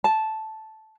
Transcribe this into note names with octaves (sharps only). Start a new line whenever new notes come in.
A5